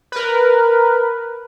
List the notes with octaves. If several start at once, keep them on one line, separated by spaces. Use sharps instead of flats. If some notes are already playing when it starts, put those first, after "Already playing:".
A#4 B4